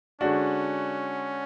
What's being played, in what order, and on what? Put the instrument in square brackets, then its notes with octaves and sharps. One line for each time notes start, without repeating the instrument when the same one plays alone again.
[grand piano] D3 G#3 D4 F#4 [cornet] C#4